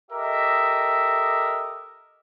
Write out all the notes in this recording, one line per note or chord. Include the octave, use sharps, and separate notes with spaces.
G4 A4 A#4 D#5 E5